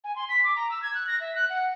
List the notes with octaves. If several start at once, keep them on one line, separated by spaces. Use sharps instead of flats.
G#5
C6
B6
D6
A#5
E6
G#6
F#6
A#6
E5
F#6
F#5